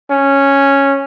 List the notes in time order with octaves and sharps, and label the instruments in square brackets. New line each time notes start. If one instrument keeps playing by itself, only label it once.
[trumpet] C#4